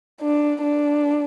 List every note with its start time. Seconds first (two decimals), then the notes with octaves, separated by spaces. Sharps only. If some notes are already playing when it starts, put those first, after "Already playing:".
0.22 D4
0.63 D4